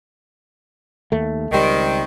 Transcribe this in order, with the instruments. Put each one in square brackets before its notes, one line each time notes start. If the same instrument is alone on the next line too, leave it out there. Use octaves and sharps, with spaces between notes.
[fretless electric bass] D#2 A3
[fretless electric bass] C#2 G3 [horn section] D#3 C4